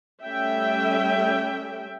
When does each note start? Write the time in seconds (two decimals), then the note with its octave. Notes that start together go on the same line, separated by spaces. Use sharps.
0.24 G3 A3 C#4 E5 G5